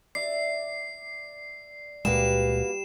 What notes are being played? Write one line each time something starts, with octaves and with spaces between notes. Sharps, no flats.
D5 E5 C7
C#2 A#2 G3 G#3 A#3 F#4 B4 E7